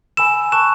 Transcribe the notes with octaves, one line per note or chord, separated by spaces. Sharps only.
G#5 B5 E6 E7
A5 C#6 F#6 E7